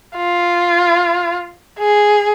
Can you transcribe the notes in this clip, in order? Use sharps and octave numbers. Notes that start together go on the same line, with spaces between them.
F4
G#4